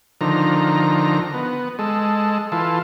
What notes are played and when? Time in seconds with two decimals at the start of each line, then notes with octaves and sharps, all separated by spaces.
0.21 D3 D#3 F3 A#5
1.34 B3
1.79 G#3 A4
2.52 E3 F4 A4